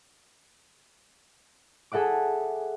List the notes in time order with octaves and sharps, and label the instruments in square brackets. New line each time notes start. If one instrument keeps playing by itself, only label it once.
[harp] G#4 A4 E5 F#5 D6